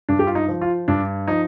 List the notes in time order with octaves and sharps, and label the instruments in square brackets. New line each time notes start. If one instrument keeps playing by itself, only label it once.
[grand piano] G2 D4
G4
F4
D#4
F3
F4
G2 D4
F3 D#4